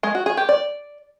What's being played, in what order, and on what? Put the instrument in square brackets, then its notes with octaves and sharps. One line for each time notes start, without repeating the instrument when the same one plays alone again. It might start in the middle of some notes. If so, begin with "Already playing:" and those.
[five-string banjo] G#3
F#4
G#4
G4
D5